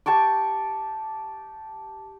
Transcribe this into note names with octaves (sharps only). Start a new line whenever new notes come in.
G4 A5 C#6 D6